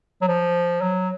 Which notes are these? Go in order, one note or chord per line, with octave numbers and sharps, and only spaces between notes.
F#3
F3
F#3